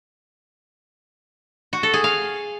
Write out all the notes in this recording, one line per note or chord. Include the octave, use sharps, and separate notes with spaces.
F#4
A4
G#4
F5